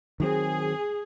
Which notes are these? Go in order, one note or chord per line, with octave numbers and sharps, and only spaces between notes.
D#3 F#3 C4 G#4